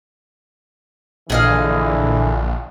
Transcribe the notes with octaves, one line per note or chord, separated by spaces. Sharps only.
A#1 D3 E3 G#4 D#5 F5